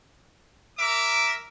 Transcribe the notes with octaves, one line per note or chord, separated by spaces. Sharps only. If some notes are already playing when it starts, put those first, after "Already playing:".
A#4 E5 D6